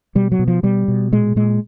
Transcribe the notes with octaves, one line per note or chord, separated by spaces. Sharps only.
B2 G3
F#3
B2
F3
B2 G3
B2
A#2 G#3
A#2 G#3